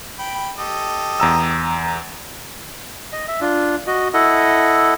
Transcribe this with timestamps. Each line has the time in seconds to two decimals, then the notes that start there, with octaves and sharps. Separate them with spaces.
0.19 G5 B5
0.58 G4 A4 D#5
1.20 E2 A#5 E6
3.12 D#5
3.28 E5
3.41 D4 F4
3.87 F#4 D#5
4.14 E4 A4 D#5 F#5